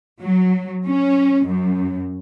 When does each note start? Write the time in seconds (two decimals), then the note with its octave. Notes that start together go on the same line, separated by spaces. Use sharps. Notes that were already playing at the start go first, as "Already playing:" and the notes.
0.20 F#3
0.86 C#4
1.47 F#2